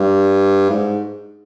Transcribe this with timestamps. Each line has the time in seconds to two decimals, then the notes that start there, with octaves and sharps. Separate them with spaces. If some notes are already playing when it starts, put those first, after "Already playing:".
Already playing: G2
0.69 G#2